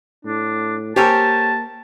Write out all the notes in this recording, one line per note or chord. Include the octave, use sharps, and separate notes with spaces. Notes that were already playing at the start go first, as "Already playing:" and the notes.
A2 D4
A#3 G4 A4 A#4 C5 C#5 G#5 A5